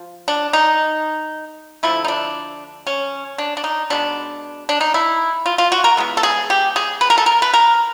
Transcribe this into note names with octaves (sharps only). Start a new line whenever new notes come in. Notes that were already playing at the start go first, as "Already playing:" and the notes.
Already playing: F3
D4
D#4
D3 F3 A3 E4
D#4
D4
C#4
D4
D4
D#4
B2 G#3 B3 D4
D4
D#4
E4
F4
F4
F#4
A#4
E3 G#3 B3
A4
G#4
G4
G#4
B4
A#4
A4
A#4
B4
A#4